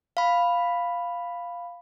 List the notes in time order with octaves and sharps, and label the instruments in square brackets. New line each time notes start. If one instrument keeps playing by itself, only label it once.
[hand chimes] F5 B5